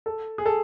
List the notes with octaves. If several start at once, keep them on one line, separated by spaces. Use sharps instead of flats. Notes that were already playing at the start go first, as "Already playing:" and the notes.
A4
G#4
A4